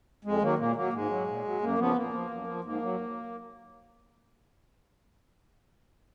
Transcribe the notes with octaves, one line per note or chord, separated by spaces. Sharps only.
F2 G#3
D#3 F#3 A#3
A#2 A#3
F#3 A#3
G#2 G#3
F#3
A#2
F#3
F#2 A#3
C#3 F3 B3
A#2 A#3
F3
F#2
F3
G#2 A#3
F#3